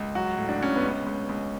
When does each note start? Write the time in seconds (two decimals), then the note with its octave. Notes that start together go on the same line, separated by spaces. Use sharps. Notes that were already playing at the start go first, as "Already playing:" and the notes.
Already playing: C#2
0.15 F#3 F#4
0.38 A2
0.49 D4
0.61 A2 C#4
0.76 B3
0.84 C#2
0.89 C#4
1.06 C#2
1.29 C#2